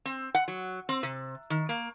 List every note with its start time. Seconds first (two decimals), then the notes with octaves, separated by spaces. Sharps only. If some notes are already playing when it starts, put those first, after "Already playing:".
0.05 C4
0.35 F#5
0.48 F#3
0.89 C4
1.03 C3
1.50 D#3
1.69 A#3